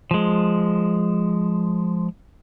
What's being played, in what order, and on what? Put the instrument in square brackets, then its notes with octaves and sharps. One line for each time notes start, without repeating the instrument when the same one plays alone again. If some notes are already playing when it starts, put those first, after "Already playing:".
[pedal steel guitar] F3 G#3